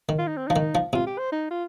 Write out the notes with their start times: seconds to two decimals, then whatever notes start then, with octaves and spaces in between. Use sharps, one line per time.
0.09 D#3
0.19 F4
0.27 D#4
0.37 C4
0.47 F3 D#4
0.56 D#3
0.75 F3
0.93 C3 F4
1.06 G4
1.18 C5
1.32 D#4
1.50 F4